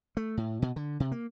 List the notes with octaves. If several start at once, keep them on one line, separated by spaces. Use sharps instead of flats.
A3
A2
B2
D3
C3
A#3